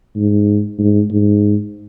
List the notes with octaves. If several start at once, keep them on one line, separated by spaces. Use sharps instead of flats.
G#2
G#2
G#2